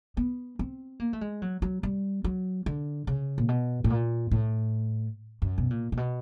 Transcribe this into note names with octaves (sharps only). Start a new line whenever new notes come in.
B3
C4
A#3
A3
G#3
F#3
F#3
G3
F#3
D3
C#3
A#2
B2
A2
A#2
A2
F#2
B2
A#2
A#2
B2